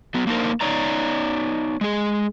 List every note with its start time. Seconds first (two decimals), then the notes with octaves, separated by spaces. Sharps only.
0.14 F#3 B3
0.27 A#3 D4 D#4 G#4 A#4 C5
0.61 B3 D#4 C#5 D5 A#5
1.81 G#3 G#4